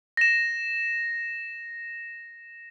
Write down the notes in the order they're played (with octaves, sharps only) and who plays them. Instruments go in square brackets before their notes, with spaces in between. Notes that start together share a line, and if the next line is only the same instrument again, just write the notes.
[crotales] A#6 E7